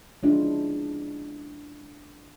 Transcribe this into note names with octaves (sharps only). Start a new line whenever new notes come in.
G#3 B3 C#4 D4 E4 F4